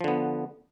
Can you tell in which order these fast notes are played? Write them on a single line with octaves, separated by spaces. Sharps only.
F3 D3 B3